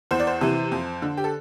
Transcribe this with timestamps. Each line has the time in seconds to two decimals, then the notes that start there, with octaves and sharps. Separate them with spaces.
0.11 E2 C5
0.20 D5
0.27 C5
0.41 C3 E3
0.72 F2
1.02 D3
1.17 G4
1.24 A4